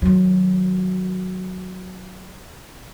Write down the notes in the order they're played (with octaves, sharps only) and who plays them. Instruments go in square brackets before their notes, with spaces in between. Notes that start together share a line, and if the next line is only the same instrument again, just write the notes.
[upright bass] D#3 F#3